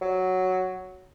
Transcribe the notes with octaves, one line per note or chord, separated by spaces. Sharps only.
F#3